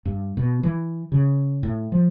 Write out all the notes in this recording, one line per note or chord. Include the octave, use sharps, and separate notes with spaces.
G2
B2
E3
C#3
A2
F3